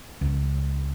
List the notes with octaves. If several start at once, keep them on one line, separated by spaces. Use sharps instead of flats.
C#2